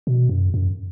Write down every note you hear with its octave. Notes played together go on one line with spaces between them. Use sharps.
B2
F#2
F#2